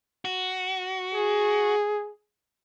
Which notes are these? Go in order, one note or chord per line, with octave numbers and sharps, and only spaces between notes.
F#4
G#4